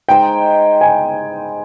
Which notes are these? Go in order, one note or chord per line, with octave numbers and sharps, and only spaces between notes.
G#3 D#4 G#4 C5 G5
G#5